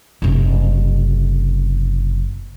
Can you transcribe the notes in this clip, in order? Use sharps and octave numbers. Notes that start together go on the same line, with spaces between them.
F#1 C3